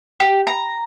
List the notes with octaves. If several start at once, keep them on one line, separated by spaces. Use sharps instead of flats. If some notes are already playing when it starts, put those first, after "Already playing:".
G4
A#5